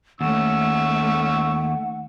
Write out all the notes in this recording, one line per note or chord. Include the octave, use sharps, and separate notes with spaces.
D#2 A3 C#4 F#5 C#6 E6